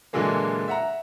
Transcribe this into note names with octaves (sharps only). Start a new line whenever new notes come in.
A#2 D3 E3 F#3 G#3 A#3
E5 F#5 A#5